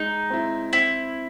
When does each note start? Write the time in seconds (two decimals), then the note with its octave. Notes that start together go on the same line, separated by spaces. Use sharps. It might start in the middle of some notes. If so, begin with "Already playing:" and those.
Already playing: G#3 D#4
0.30 C4 E4
0.73 C4 E4